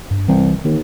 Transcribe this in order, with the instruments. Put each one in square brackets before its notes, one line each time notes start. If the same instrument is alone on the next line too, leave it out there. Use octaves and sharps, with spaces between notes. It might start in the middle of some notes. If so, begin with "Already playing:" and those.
[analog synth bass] G2
[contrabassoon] C2 [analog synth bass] E3
[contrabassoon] D#2 [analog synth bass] D#3